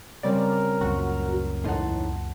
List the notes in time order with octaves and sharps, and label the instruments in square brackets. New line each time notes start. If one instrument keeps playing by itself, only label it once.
[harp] C#3 G3 C4 [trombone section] A#4 [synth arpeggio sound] D5
[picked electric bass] C#2 F#2 A#2 [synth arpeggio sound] F#4 [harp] F#5 C#6
[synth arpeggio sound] E2 A2 D#4 [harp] F#5 A5 C6